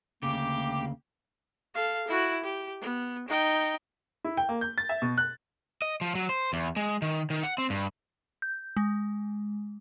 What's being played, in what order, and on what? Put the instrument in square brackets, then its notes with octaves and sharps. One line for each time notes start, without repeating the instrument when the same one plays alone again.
[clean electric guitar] D2 A#2 C#3 [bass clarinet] A#3 [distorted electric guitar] G4 [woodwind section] D6
[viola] A4 F5
E4 F#4
G4
B3
D#4 G5
[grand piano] E4
G5
A#3
G6
A6
E5
B2
F#6
[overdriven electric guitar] D#5
F3
F#3
C5
E2
G#3
D#3
D#3
F#5
C4
G2
[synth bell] G6
G#3